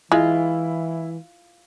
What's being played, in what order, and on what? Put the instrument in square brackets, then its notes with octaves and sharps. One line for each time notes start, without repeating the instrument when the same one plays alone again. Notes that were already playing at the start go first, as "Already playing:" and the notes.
[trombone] E3 [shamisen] G#3 [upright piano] E4 [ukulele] F4